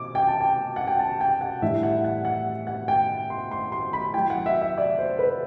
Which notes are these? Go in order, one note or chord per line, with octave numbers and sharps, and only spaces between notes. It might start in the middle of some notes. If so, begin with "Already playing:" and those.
Already playing: B2 C4 D6
G5
A5
G5
F#5
G5
A5
G5
F#5
A2 E3 G3 D4 E5
F#5
F#5
F#5
F#5
G5
C6
C6
C6
B5
F#3 A3 E4 G5
F#5
E5
E5
D5
C5
B4